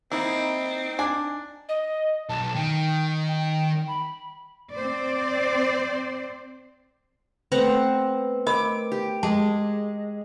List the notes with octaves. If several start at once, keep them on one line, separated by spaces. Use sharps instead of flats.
A#3 C4 D#4 E4
D4 G#5
D#5
B1 A5
D#3 G5
G5
B5
C4 C5 D5
A3 B3 C4 B4 F#5 A#5
A#4 D#5 B5 D6
G4
G#3 G#4 A5